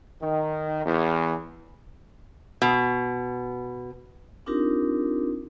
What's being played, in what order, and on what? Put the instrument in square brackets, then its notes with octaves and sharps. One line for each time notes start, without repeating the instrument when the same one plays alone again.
[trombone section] D#3
E2
[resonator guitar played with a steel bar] B2
[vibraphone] C4 D4 D#4 F4 G4 A#4